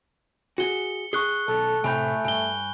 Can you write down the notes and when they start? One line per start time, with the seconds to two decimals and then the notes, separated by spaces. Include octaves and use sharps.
0.58 F#4 G#4 C#7 G7
1.13 G#4 C#6 F#6 G7
1.48 B1 A4
1.84 A2 C3 A3 G#5 B5 G6
2.25 G2 A#2 G#5 G7